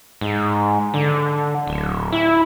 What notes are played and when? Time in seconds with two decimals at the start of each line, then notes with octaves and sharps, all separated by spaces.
0.21 G#2
0.94 D3
1.67 D1
2.12 E4